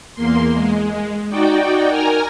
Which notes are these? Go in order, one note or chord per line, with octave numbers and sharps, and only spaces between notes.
E2 A#3 C6
G#3
D#4 F#4 D5 G5
A#4 G#5 A#5 F6